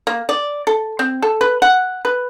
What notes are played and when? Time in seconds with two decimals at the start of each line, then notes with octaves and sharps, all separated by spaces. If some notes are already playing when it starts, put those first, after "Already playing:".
0.07 A#3
0.29 D5
0.67 A4
0.99 C4
1.22 A4
1.41 B4
1.62 F#5
2.05 B4